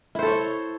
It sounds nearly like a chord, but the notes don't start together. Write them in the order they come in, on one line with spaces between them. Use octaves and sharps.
E4 C5 A4 C#5